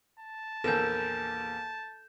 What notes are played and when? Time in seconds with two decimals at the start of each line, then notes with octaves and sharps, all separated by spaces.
0.20 A5
0.64 A#1 E2 A#3 A4 G6 E7